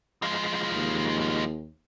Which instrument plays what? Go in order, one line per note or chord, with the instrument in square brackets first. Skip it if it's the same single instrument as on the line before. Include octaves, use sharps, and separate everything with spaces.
[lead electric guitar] F3 G#3
[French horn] D#2